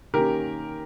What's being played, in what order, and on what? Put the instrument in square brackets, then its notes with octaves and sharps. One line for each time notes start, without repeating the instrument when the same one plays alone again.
[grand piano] D#3 A#3 C#4 G4 A#4